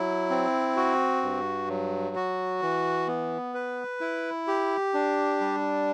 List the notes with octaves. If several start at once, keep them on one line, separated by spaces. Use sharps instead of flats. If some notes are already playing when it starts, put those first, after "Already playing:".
Already playing: F#3 E4
C4
F#4
G2
F#3
F#4
E3
B3
B4
E4
G4
D4
G3